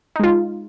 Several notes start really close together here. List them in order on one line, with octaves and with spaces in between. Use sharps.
D#4 G#3 F4